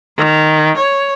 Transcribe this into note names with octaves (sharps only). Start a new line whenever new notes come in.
D#3
C#5